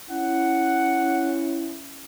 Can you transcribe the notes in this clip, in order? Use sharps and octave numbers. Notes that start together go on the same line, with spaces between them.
C#4 E4 F#5